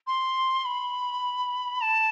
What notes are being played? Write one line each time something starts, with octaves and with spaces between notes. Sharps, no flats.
C6
B5
A5